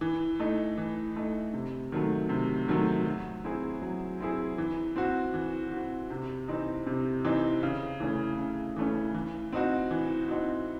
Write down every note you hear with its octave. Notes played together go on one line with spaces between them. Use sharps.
E3
A3 D#4
E3
A3 D#4
C3
D#3 F#3 A3
C3
D#3 F#3 A3
F#3
C4 E4 G#4
F#3
C4 E4 G#4
E3
C4 F#4
E3
C4 F#4
C3
E3 C4 D#4
C3
E3 C4 D#4
C#3
E3 A3 C#4
C#3
E3 A3 C#4
E3
C4 D#4 F#4
E3
C4 D#4 F#4